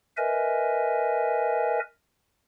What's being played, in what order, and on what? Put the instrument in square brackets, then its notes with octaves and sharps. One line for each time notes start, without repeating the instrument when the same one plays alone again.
[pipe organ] A#4 B4 D#5 E5 G#5